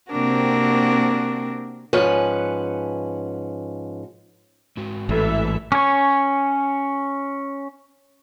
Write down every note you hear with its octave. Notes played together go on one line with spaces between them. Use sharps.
C3 A#3 C4 D4 F#4 A#4
G#2 F3 C#4 B4 F#5
G#2 G#3 F#4
A1 E3 A4 E5
C#4 C#5